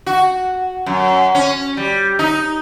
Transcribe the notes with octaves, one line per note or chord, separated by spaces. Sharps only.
F#4
F#2
C#4
G3
D#4